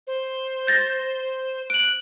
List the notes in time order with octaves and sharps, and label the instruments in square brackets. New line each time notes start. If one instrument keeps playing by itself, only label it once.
[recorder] C5
[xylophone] G6 A6 A#6
[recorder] F#6 [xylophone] D7 F#7